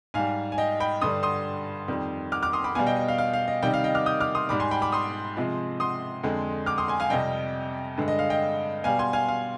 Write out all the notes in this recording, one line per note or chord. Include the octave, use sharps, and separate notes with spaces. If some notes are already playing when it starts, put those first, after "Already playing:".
G#2 G3 F5 G#5
G#5
D#5 G5
G5 B5
G2 D3 G3 C6 D#6
C6 D#6
F2 D#3 G3
D6 F6
D6 F6
C6 D#6
B5 D6
B2 G3 F5 G#5
D#5 G5
D#5
F5
F5
F5
D#5
C3 D#3 G3 D#5 G5
F5
D#5 G5
D6 F6
D#6 G6
D6 F6
C6 D#6
G#2 G3 B5 D6
G#5 C6
G5 B5
B5 D6
C6 D#6
C3 F3 G#3
C6 D#6
F2 D3 G#3
D6 F6
C6 D#6
G#5 C6
F5 G#5
F2 C3 G3 D#5 G5
G2 D3 G#3
D#5
F5
D#5 G5
B2 G3 F5 G#5
G#5 C6
F5 G#5
F5